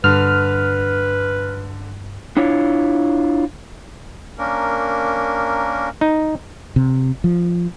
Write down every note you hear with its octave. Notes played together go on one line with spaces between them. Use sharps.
G2 D3 B4 F6
D4 E4 F4 C#5
A#3 C#4 D4 A#4
D#4
C3
F3